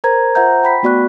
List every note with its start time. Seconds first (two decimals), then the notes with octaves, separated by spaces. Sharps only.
0.04 A#4 C5 A#5 G#6
0.35 F4 C5 E5 F#5 A#5 G6
0.64 G5 B5 B6
0.83 A3 B3 F#4 D5 C#6 F#6